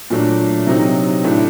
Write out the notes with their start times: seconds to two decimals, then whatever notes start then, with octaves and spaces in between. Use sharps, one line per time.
0.10 A#2 F#3 A3 D4
0.66 C3 F#3 C4 D#4
1.24 A2 A3 D4